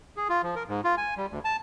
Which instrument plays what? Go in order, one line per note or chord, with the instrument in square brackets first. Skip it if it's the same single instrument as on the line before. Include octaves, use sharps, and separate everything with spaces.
[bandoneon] G#4
F4
F3
A#4
G#2
F4
G#5
G3
D2
A5